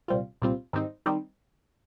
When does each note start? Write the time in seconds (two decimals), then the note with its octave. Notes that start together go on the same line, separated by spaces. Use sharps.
0.08 C2 A#2 G3 C4 F4
0.42 C2 A#2 G3 C4 F4
0.73 G#2 D#3 G3 C4 D#4
1.06 D#3 G3 C4 D#4